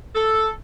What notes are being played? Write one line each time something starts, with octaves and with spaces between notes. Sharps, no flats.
A4